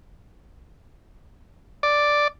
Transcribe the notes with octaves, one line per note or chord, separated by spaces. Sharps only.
D5